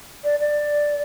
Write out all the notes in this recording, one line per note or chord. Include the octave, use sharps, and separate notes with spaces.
D5
D5